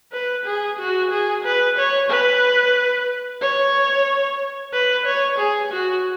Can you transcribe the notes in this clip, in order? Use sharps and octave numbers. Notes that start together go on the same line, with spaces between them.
B4
G#4
F#4
G#4
B4
C#5
B4
C#5
B4
C#5
G#4
F#4